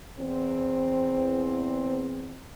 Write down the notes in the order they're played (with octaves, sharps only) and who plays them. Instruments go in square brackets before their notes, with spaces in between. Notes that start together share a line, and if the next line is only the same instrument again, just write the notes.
[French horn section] E2 C4